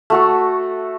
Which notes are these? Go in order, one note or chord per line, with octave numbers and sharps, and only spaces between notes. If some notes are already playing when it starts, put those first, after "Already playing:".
A3 F#4 A4